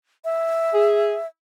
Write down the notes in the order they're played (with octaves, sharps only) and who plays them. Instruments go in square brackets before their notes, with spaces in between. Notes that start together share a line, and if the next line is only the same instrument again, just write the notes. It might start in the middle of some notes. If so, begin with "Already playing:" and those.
[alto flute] E5
[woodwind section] G#4